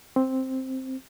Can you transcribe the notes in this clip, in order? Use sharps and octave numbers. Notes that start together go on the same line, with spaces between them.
C4